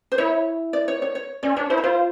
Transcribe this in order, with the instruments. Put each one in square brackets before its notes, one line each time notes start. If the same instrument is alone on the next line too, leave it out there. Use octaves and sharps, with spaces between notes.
[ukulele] C5
[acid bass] E4 [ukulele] C#5
[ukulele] D5
C#5
C#5
C#5
[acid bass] C#4 [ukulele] D5
[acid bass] D4 [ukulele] C#5
[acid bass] E4 [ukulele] C5
[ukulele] C#5
[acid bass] F4 [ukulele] C5